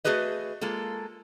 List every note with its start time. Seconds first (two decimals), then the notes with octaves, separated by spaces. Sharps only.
0.05 A3 C#4 F#4 G#4 B4 D#5
0.61 G#3 A#3 F4 A4